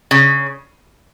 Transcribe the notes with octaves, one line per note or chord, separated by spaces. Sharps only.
C#3